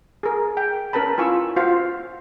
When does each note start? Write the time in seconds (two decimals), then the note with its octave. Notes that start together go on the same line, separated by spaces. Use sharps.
0.23 G#4 A#4
0.57 G5
0.93 C#4 A#4 B4 A5 B5
1.18 E4 F4 G#5 C#6 E6
1.56 F4 F#4 C5 F5